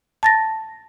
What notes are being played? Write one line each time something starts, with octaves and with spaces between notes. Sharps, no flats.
A5 A6 A#6